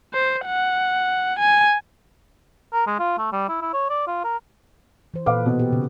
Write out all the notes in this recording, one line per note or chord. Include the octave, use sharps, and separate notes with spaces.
C5
F#5
G#5
A#4
G#3
F4
A3
G3
E4
E4
C#5
D5
F4
A#4
E3 C5
A#2 A4 B4 F5 D6
B2
G4
C#3